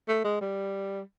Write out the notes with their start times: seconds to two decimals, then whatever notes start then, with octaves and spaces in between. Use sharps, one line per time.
0.08 A3
0.24 G#3
0.41 G3